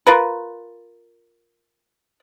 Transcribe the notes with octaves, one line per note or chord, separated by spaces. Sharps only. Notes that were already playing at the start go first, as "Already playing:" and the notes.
F4 A#4 B4